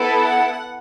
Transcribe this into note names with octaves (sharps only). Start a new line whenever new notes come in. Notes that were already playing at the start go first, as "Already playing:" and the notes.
Already playing: B3 E4 A4
F#5